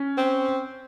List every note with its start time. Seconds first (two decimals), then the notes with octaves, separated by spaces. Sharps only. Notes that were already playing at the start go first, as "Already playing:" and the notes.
Already playing: C#4
0.17 C4